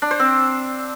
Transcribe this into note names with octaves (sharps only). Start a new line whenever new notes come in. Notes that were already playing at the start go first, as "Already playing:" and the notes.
D4
C5
C4